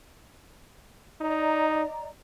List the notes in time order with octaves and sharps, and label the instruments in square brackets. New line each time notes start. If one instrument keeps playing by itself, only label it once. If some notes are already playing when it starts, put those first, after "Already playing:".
[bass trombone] D#4 [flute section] D5 D#5 A#5